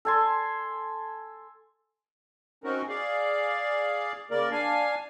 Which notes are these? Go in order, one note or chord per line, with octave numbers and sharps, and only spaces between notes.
A4 G#5 C6
C4 C#4 D#4 F#4 A#4
G#4 D5 F5
C#3 A#3 A#4 D5
D4 F5 G#5